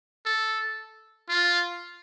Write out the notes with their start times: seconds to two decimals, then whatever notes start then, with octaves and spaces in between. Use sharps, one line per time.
0.26 A4
1.29 F4